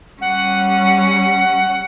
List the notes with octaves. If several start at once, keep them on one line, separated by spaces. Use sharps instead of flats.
G3 C#4 F#5